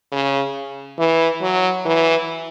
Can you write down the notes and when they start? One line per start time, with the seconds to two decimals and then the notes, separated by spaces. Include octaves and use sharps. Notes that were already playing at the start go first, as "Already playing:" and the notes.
0.12 C#3
0.98 E3
1.41 F#3
1.85 E3